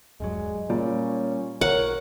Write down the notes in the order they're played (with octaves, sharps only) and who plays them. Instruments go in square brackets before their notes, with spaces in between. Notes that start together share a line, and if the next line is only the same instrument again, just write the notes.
[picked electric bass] D#1 G2 F#3 [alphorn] G#3
[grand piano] A#2 [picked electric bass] G3 [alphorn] C#4
[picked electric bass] B1 [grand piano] A#4 [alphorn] C#5 [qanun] F#5